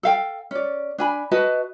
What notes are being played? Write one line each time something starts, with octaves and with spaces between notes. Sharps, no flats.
A4 F5 G5
C#4 D5
D4 G#5 B5
F#4 B4 D#5 A5